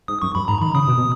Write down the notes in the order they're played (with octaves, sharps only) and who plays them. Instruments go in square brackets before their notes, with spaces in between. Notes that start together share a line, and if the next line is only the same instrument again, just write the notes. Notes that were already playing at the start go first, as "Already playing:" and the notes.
[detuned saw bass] G#2 [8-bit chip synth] D#6
[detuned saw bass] F#2 [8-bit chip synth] C#6
[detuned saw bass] F#2 [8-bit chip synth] B5
[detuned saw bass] G#2 [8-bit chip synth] A#5
[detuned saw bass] D#3 [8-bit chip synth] B5
[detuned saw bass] C#3 [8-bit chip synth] D#6
[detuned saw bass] B2
B2